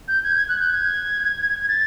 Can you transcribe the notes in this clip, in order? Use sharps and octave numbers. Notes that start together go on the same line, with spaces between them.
G6
G#6
G#6
F#6
G6
G#6
G#6
A6